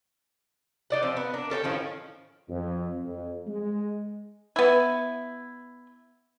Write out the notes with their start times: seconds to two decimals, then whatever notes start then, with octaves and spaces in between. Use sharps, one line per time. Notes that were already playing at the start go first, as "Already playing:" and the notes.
0.90 D#4 D5 F#5
1.03 F3 C4
1.17 B3
1.34 D4 A#4
1.50 C#4 A4 C5 G5
1.64 A2 D#3 F3 C#4
2.49 F2
3.05 F2
3.47 G#3
4.56 B3 E4